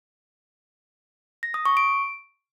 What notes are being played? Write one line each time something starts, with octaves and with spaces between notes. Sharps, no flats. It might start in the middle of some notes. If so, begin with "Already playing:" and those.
A#6
D#6
C#6
D7